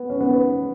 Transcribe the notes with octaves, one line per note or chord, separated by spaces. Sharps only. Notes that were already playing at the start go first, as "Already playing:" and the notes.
Already playing: B3
C#4
B3